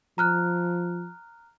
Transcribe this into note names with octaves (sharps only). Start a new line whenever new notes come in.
F3 A#5 F6 F#6